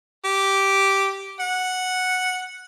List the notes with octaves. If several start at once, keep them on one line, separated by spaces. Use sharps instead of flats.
G4
F#5